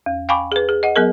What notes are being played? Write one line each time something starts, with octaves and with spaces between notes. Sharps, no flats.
E2
F5 G5 G#5 B5 C#6 D6
G#4 B4
G#4
D#5 F#5
F#3 B3 G#4 A#4